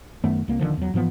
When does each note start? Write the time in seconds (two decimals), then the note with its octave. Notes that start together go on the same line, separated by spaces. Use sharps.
0.24 F#2 D#3 A3 B3
0.48 C2 A#3
0.60 D#1 D3 D#3 F3
0.77 E2 F#3
0.94 G#2 E3 F3 B3